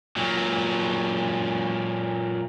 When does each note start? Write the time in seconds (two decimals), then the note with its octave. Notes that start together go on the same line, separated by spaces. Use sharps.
0.16 A#2 F#3